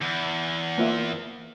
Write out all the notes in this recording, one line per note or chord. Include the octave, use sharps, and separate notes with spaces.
E2
A#3 F4 E5